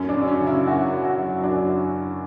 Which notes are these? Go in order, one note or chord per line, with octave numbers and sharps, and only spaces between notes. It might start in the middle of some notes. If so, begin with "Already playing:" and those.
Already playing: F#2 C#4
D4
F#3
C#4
C#3
E4
F#2 F#4
F#2
F#4
F#3
F#2 D4